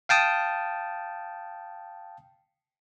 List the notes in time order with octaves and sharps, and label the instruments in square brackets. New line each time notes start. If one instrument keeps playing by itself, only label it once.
[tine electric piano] F5 G5 A5 D#6